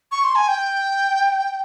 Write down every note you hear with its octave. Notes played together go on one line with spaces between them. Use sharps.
C#6
C6
G#5
G5